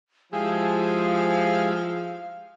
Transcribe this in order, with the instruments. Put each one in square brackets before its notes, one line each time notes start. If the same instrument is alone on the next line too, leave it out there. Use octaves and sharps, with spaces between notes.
[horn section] F3 [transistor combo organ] G#3 E4 G4 [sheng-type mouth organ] G#4 [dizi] F5